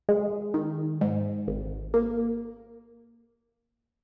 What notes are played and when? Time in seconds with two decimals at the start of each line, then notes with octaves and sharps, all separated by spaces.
0.09 G#3
0.54 D#3
1.01 G#2
1.48 G#1
1.94 A#3